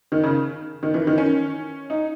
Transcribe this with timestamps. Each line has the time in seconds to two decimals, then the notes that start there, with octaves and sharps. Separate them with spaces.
0.12 D#3
0.24 C#3
0.83 D#3
0.94 E3
1.07 D#3
1.18 C#4
1.90 D#4